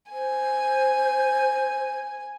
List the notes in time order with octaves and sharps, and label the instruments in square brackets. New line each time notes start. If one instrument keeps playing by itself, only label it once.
[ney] C5 [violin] G#5